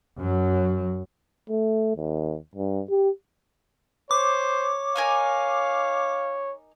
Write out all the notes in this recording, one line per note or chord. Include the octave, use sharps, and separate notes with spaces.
F#2 F#3
A3
D#2
G2
G4
C5 C#5 D6
D#4 A#4 F5 G#5